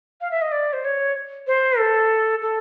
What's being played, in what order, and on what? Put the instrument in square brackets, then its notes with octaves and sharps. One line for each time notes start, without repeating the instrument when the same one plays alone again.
[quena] F5
E5
D#5
D5
C5
C#5
C5
A4
A4